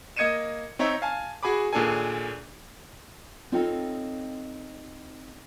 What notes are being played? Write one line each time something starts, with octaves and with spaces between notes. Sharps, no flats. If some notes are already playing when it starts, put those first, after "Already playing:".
A#3 D#5 G#6 C#7 D#7 E7
C4 D#4 C#5 E5 A#5
F5 G#5 A5
F#4 G#4 G#5 B5 D6
D#2 A#2 D4 G#4 A4 G#5
C4 D#4 F4 A4 C#5 G5